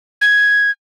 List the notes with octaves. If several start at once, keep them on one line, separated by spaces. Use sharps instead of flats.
G#6